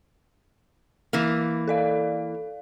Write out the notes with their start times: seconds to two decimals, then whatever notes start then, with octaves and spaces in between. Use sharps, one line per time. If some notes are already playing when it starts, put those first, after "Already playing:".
1.13 E3 A#3
1.68 A4 D5 F5